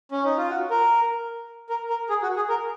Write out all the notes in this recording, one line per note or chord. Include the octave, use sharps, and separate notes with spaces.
C#4
D#4
F4
F#4
A#4
A#4
A#4
G#4
F#4
G#4
A#4